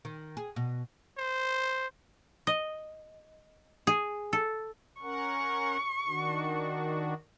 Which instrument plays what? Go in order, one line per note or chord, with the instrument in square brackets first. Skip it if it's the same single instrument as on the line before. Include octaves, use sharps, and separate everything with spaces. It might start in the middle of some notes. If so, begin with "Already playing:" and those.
[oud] D#3
G#4
B2
[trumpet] C5
[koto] D#5
G#4
A4
[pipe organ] C#4 A#4 F#5 [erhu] C#6
[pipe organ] D#3 D4 F#4